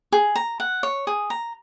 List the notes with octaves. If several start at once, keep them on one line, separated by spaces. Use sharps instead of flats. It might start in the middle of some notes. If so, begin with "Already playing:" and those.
G#4
A#5
F#5
C#5
G#4
A#5